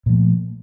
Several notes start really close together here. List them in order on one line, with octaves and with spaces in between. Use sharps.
A#2 F3 A3